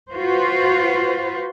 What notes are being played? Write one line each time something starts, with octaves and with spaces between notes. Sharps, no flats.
F4 F#4 B4 C5